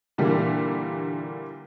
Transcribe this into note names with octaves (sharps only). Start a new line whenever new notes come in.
A#2 D3 E3 G3 A#3